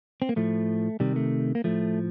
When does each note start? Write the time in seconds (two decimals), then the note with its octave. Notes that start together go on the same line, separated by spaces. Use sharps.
0.22 C4
0.29 A#3
0.36 A2 F3 A3
1.00 C3 D#3 G3
1.16 A3
1.55 A#3
1.64 A2 F3 A3